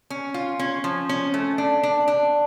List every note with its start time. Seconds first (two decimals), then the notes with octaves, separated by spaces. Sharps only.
0.10 C#4
0.34 F4
0.59 C#4
0.84 F3
1.09 C#4
1.34 A3
1.58 D4
1.83 D4
2.08 D4